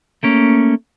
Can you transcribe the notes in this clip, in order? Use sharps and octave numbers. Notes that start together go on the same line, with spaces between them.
A3 A#3 C#4